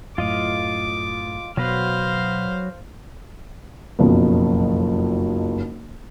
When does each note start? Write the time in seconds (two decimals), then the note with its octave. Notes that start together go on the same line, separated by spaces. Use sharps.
0.18 F#2 A2 F4 D#5 F5 D6
1.57 B2 F#3 B3 F#4 B4 C5 F5
3.99 F#1 B1 F2